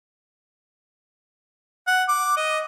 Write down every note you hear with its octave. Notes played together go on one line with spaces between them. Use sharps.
F#5
D6
D#5